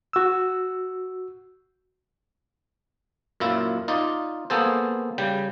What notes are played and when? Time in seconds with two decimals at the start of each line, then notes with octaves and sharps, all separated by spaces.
0.13 F#4 E6
3.40 F#2 A#2 E4 F4
3.88 D#4 F4 D5
4.50 A#3 B3 G#4 A4 C5
5.18 C#3 G3 G5